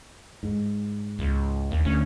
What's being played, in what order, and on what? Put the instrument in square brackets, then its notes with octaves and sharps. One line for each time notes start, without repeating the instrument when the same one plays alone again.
[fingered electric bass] G#2
[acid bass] C#2
D#2
[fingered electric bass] D2 [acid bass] C#4